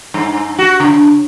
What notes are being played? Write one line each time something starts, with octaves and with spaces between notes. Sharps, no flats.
G2
F#4
C#3